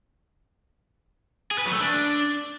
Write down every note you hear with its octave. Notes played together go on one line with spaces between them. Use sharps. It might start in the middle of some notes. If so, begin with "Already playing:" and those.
G#4
B4
F#3
A3
D4